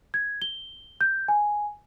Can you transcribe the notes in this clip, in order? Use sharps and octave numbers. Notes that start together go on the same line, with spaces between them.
G#6
G7
G6
G#5